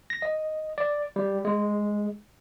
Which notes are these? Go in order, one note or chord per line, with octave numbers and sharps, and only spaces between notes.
A#6
D#5
D5
G3
G#3